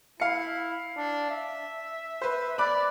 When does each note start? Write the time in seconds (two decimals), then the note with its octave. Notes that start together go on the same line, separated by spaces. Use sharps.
0.20 E4 F5 C#7
0.97 D4
1.30 E5
2.21 B4 C5
2.58 D5 B5 D6 F#6